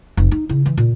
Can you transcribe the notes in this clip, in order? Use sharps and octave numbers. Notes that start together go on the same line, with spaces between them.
F1
D#4
C#3 E4
E3
A#2